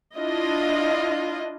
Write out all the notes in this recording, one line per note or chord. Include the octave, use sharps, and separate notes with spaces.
D4 E4 F4 D#5